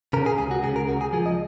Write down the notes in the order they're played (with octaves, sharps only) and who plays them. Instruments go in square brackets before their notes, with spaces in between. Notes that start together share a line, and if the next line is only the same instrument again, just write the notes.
[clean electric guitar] C#3 A#4
G#4
C#2 G#4
F#4
C#3 G#4
A#4
C#2 F#4
G#4
F3 G#4
D#5